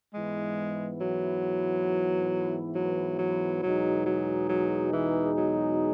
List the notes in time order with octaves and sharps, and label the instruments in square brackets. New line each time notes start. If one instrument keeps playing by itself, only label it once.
[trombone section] G#2 E3 B3 E4 [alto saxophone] G#3
[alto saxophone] F#3
F#3
F#3
[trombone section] E2 B2 G#3 D#4 G#4 [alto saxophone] F#3
[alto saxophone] F#3
F#3
E3
F#3